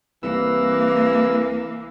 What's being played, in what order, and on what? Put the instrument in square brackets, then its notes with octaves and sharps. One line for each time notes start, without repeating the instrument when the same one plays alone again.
[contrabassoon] C2 [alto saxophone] E3 [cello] A#3 [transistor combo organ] B4 E6